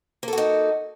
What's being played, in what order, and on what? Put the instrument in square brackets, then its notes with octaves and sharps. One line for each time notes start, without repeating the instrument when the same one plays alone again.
[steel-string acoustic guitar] A#3
A4
F#4
D#4